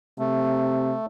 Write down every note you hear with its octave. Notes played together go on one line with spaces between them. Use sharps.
C3 A3